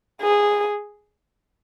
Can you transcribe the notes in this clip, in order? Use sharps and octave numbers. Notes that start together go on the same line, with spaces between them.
G#4